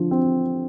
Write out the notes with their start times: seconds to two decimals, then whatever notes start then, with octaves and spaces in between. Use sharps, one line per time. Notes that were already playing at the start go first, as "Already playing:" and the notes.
Already playing: D3 F3
0.11 C4